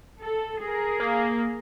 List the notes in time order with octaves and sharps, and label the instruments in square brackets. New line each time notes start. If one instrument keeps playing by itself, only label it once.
[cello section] A4
G#4 A#4
[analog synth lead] A#3